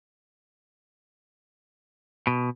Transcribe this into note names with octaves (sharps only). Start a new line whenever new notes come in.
B2